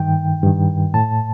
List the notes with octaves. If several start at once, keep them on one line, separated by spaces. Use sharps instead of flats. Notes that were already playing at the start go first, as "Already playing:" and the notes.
Already playing: G2 D#3 G5
G2 D#3
A2 A5